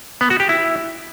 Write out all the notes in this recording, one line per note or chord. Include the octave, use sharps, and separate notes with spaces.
B3
F#4
G4
E4